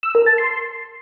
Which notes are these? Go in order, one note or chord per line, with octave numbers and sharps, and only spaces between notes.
E6
A#4
A5
C6